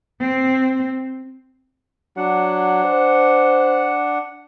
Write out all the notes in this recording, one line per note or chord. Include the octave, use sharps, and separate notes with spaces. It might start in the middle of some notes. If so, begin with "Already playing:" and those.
C4
F#3 D4 F#5
C5